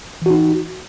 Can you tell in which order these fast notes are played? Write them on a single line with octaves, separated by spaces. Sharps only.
E3 F#4 D#4